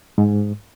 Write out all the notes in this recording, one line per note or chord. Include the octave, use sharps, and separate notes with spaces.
G#2